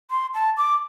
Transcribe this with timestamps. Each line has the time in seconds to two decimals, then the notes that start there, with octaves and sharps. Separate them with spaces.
0.10 C6
0.34 A5
0.57 D6